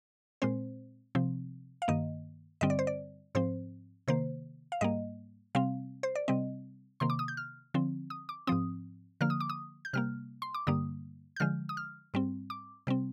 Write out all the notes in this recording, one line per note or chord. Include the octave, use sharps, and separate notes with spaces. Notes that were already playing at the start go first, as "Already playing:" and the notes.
A#2 G#3 C4 C5
C3 F3 C4
F5
G2 D#3 A#3 D#5
G2 D3 G3 C4 D#5
D5
C5
D5
G#2 F3 C4 C5
C3 D#3 A#3 C5
F5
G#2 G3 A#3 D#5
C3 G3 C4 F5
C5
D5
C3 G3 C4 D#5
C3 D#3 A#3 C6
D6
D#6
G6
F6
D3 F3 C4
D#6
D6
G#2 F3 C4 D#6
D3 F3 A#3 F6
D#6
D6
D#6
G6
C3 G3 A#3 F6
C6
D6
G2 D3 G3 A#3 D#6
G6
D3 F3 G#3 F6
D#6
F6
G#2 G3 C4
D6
C3 G3 C4